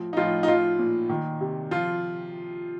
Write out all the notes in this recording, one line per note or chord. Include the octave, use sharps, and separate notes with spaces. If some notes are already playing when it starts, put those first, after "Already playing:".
Already playing: A2 F3
D#4
A2 F3 F4
D#4
F3 F4
A#2
D#3
C3
F3 F4